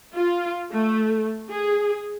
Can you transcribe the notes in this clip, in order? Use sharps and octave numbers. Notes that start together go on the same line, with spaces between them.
F4
A3
G#4